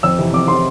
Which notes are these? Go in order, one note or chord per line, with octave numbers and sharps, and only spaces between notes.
F2 E6
C3 E3
F2 D6
C3 E3 C6